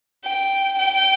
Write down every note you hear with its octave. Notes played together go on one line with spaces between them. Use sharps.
G5
G5